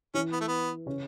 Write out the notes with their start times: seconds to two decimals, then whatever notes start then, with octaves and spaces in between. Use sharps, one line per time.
0.14 E3 C#4 E4
0.32 B3
0.41 A3
0.48 B3
0.86 C#3 C#4